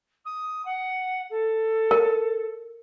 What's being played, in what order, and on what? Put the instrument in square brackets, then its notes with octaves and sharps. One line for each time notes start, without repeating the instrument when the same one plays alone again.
[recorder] D#6
F#5
A4
[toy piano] A#4